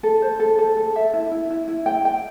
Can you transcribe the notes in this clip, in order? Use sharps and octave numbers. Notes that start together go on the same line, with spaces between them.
A4
C5
A4
A4
A4
E5
E4
E4
E4
E4
G5
G5